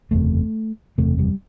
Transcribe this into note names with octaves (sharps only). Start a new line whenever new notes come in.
F#1 E2 C3 A3
F#1 E2 C3 A3
G3